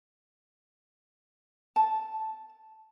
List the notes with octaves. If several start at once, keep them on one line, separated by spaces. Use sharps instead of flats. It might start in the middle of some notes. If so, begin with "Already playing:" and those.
A5